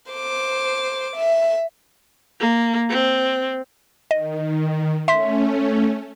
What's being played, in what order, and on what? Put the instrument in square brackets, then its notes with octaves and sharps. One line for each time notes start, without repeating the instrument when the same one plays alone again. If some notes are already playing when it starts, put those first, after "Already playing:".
[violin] C5 D6
E5
[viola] A#3
C4
[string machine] D#3 [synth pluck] D#5
[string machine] A3 C#4 [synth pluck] E5 C6 B6